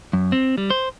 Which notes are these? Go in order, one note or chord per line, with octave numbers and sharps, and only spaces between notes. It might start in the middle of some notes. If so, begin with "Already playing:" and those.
F#2
C4
G3
C5